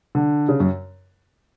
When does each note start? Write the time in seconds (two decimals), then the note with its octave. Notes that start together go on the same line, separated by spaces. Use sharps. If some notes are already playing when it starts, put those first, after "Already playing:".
0.15 D3
0.48 C#3
0.60 F#2